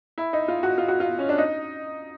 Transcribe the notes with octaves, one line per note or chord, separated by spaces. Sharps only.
E4
D#4
F4
F#4
F4
F#4
F4
C#4
D4
D#4